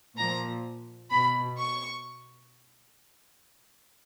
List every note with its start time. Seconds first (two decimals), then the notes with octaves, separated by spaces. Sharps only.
0.17 A#2 F3 A#5
1.10 B2 B5
1.57 C#6